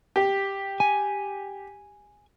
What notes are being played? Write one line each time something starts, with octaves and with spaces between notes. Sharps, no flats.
G4
G#5